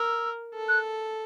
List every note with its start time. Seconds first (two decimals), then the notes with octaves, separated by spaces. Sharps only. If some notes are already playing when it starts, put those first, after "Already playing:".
Already playing: A#4 E6
0.54 A4
0.68 F#6